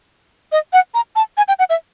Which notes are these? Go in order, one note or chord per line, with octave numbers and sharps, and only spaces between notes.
D#5
F#5
A#5
A5
G#5
G5
F#5
E5